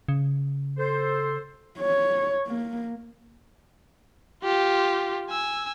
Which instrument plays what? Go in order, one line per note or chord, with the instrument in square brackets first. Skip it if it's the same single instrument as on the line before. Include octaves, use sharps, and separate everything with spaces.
[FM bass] C#3
[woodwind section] A4 C5
[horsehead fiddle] C#5
A#3
[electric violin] F4 G4
G#5 E6